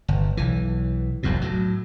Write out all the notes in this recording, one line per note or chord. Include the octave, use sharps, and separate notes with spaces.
G1
B1 E3
F1 B1 E2 B2
A2 F#3